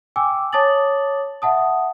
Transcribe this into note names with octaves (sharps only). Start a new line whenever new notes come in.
G5 G#5 D6 E6
C#5 A5 D6 D#6 A6 F#7
E5 F#5 A5 D#6